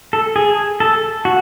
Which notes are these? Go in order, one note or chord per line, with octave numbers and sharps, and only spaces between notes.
A4
G#4
A4
F#4